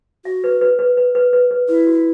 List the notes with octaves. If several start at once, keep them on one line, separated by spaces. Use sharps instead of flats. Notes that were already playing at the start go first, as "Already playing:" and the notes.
F#4 E5
B4
B4
B4
B4
B4
B4
B4
E4 B4
F#4